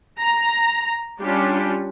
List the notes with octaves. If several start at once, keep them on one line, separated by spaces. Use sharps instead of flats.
A#5
G3 C#4 D4 F4 G4